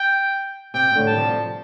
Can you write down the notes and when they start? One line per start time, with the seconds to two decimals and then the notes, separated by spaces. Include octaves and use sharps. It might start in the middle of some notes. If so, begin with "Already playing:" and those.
Already playing: G5
0.74 C3 G5
0.92 C3
0.96 A2 D3
1.07 G3 A5
1.17 C3 F3